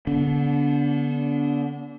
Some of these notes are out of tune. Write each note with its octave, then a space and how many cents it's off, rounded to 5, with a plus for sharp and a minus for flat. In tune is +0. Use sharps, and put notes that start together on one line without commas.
D3 -25 B3 -10 D4 -35